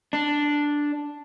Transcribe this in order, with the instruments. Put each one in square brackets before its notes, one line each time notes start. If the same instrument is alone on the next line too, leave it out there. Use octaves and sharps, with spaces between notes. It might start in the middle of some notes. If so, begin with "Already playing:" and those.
[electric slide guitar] D4